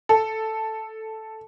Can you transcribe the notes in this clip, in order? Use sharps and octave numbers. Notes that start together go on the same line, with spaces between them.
A4